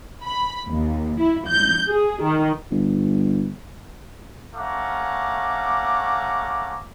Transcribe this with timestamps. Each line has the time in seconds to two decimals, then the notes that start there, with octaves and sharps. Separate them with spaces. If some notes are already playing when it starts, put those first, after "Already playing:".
0.24 B5
0.67 D#2
1.19 E4
1.48 G6
1.89 G#4
2.23 D#3
2.71 G1
4.55 A3 C#4 F5 F#5 A#5 D6